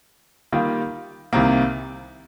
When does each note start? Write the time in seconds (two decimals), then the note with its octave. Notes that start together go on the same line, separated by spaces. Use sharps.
0.52 D#3 G3 A#3 F4
1.33 C2 C3 D#3 A#3